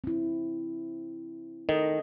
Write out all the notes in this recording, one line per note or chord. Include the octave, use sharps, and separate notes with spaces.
C4 E4
D#3 A4 D#5